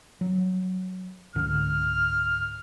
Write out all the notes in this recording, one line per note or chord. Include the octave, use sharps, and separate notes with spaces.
F#3
C#2 G#2 D3 F6